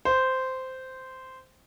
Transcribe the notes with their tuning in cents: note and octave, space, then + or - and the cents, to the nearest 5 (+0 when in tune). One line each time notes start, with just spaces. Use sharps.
C5 -10